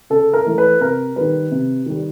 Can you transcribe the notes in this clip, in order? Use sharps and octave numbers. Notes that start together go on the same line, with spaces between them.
C#3 A4
A#4
E3 A3
B4
C3 A#4
D#3 G3 B4
C3
D#3 G3